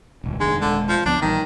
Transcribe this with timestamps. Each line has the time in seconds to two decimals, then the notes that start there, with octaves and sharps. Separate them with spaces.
0.24 D#1 C#2
0.40 F1 D#3 G#3 D4
0.61 D#1 D3 G#3
0.89 F3
1.06 C#2 F3 B3 D4
1.22 A#1 D#3 E3 G3